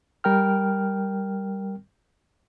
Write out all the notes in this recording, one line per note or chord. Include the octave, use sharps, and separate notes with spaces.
G3 A#4 G5 F6